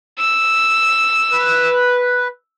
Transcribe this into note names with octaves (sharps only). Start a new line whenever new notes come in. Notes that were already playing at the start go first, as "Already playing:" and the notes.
E6
B4